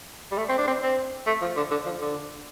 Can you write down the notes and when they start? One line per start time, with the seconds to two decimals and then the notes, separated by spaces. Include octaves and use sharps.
0.31 G3
0.38 A3
0.49 C4
0.58 D4
0.67 C4
0.83 C4
1.27 A3
1.41 F3
1.56 D3
1.71 D3
1.85 F3
2.01 D3